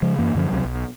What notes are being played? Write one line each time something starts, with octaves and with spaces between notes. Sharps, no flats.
C#3 F3 G#3
F#2 E3 A#3
F#2 D3 F3 C#4
C#2 C3 F#3
B1